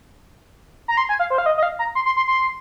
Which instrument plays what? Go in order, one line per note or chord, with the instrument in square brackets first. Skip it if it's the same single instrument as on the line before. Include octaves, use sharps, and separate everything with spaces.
[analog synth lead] A#5
C6
G#5
F5
C5
F5
D#5
D#5
F5
A#5
C6
C6
C6
C6